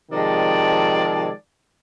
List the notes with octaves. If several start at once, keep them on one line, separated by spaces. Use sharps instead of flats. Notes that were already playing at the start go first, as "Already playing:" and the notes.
C3 D#3 F3 G#3 D5 A5